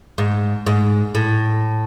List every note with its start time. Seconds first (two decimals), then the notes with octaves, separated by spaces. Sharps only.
0.18 G#2
0.67 G#2
1.15 A2